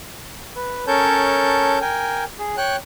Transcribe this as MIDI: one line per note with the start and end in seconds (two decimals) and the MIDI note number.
0.56 0.85 71
0.87 1.79 61
0.87 1.79 69
0.87 1.79 70
0.87 1.79 73
0.87 1.79 81
0.87 1.79 91
1.81 2.24 70
1.81 2.24 79
1.81 2.24 80
2.39 2.56 68
2.57 2.76 73
2.57 2.76 79
2.57 2.76 90